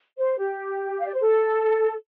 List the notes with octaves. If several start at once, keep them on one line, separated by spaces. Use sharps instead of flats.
C5
G4
F5
D5
C5
A4